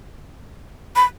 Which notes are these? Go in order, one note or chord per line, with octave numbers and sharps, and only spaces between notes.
B5